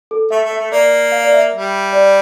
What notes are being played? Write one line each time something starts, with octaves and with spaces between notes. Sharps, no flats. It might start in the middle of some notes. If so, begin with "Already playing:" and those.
A4
A3 E5
A3
E5
A3
A#3 D5
F5
D5
E5
G3
D5